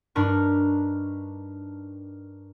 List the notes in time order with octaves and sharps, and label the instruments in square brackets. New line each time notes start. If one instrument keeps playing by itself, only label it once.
[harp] G2 D4 D#4 A#4 C#6 F6